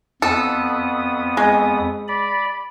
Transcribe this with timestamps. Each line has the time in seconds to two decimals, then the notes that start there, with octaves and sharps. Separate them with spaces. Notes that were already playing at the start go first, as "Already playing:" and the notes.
0.22 F2 B3 A4 D#6
1.37 G#3
2.08 D5 B5